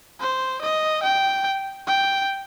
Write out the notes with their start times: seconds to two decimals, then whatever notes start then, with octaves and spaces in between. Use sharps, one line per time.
0.20 C5
0.62 D#5
1.03 G5
1.87 G5